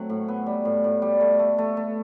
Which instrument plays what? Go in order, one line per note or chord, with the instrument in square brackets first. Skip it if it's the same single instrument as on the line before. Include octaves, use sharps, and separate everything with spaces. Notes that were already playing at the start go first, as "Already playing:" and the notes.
Already playing: [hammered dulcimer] F#3 A3 C4
A2
B3
G3
A2
A2
G3
A3
A3
A3
A3